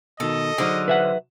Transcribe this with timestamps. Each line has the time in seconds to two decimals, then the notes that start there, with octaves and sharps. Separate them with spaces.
0.20 B2 D#3 A4 D#5
0.58 D3 F#3 D#4 G#4 C5 F5
0.88 B4 E5 F#5